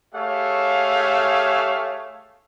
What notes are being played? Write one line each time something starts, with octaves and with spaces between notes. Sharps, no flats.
A3 G4 G#4 C#5 E5 F5